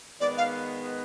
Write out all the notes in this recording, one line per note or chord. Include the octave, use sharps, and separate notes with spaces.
D#3 G#3 B3 D5
F5